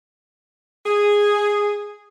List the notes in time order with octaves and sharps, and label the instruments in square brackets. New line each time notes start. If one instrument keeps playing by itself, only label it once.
[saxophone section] G#4